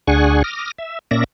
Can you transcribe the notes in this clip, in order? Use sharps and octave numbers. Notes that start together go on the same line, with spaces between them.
D2 D4 G#4 F#5 G#5 C#6
D6 D#6 F6 A#6
E5
A#2 A#3 C#4 D5 E5 A#6